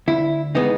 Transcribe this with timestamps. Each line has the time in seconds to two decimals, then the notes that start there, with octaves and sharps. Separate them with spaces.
0.07 D2 E4
0.55 C#3 E3 G#3 B3 D#4